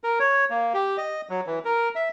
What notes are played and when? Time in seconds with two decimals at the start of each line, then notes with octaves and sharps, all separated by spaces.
0.04 A#4
0.20 C#5
0.50 A#3
0.74 G4
0.97 D#5
1.29 F#3
1.47 E3
1.65 A#4
1.95 E5